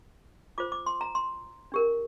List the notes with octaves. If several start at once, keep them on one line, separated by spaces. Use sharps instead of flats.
F4 C5 D6
D6
C6
A#5
C6
D4 G4 A#4